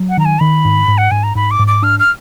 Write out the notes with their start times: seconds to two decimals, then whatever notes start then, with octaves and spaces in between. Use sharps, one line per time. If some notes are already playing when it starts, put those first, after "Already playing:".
Already playing: F#3
0.10 F#5
0.17 D#3 A#5
0.25 G#5
0.41 D#3 B5
0.65 G#2
0.88 G#2
0.98 F#5
1.11 G#2 G#5
1.23 A#5
1.35 G#2 B5
1.51 D6
1.59 G#2
1.67 D6
1.83 D4 F6
2.00 F6